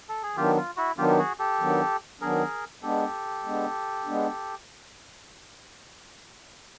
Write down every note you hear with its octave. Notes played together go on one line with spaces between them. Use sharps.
A4
G#4
D#3 F#3 B3 D4 F4 G4
F4
E4 F#4
D#3 F#3 B3 D4 F4 G4
G4
F#4 G#4
G4 A4
D#3 F#3 B3 D4
D#3 F#3 B3 D4 G#4 A#4
G#3 B3 D4 G4 A4
G#3 B3 D4
G#3 B3 D4